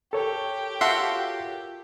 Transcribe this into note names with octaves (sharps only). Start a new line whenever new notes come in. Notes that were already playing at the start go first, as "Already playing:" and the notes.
G4 A4 A#4 C#5
F4 F#4 E5 F#5 A5 C6